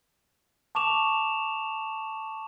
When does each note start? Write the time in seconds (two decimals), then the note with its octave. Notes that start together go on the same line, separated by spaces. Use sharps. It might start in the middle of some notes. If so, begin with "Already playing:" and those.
0.75 A5 C#6 D6 E7 F7